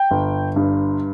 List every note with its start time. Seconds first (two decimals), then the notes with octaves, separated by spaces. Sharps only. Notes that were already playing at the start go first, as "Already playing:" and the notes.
Already playing: G5
0.11 G1
0.56 G2